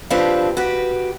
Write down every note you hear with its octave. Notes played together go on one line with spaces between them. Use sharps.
F3 C4 D4 G4 B4
F#4 G4 B4